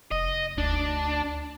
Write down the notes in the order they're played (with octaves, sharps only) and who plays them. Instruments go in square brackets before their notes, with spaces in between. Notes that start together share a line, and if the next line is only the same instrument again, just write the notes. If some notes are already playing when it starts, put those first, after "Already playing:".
[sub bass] F1 [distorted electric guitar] D#5
[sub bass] D2 [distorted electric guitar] D4